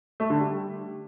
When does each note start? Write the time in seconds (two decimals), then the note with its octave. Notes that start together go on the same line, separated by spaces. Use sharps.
0.20 A3
0.30 D3
0.40 G3